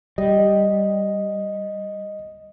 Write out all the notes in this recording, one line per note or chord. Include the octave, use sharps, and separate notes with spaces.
G3 D#5